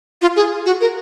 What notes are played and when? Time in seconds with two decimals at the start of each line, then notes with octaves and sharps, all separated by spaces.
0.22 F4
0.36 G#4
0.66 F#4
0.81 A#4